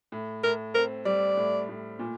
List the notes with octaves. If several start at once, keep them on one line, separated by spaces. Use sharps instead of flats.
A2
A2 A#4
C4 A#4
G3 D5
A2
A2
A#2